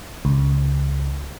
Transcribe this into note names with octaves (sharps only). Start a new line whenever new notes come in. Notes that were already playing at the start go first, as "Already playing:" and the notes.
C#2